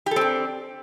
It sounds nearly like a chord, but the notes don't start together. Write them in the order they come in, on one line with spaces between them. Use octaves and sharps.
G4 A4 C4 D4